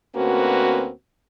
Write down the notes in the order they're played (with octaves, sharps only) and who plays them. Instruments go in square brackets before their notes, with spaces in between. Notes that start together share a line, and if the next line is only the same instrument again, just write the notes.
[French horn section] D2 A#3 C4 C#4 F#4 B4